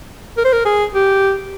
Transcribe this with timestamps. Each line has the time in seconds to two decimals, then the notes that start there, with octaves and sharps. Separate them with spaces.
0.37 A#4
0.45 C5
0.53 A#4
0.65 G#4
0.94 G4